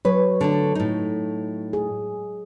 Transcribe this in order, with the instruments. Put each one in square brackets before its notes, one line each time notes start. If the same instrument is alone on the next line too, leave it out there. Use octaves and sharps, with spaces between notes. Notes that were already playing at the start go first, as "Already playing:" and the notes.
[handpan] F#3 C#5 [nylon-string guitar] B4
[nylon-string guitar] D3 A3 D4
A2 D#4
[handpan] G#4